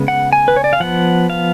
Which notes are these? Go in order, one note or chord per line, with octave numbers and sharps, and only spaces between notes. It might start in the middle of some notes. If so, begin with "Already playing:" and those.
Already playing: C#3 G#3 B3
F#5
G#5
B4
C#5
D5
F5
F3 B3 F#5
F5